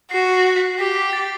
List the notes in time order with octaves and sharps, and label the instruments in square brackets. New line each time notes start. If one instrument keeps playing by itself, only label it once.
[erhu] F#4 [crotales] C7
[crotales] C7
B6
[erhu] G4 [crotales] B6
[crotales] B6
A6